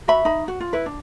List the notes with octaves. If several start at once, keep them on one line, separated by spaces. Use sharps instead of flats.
F#4 E5 B5
D#4 B5
F#4
F4
E4 B4
D4